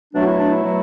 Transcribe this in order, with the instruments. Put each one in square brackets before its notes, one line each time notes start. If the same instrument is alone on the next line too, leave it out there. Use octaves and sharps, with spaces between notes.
[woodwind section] B2 F#3 A3 D4
F#4
E4
D4
E4
B2 F#3 A3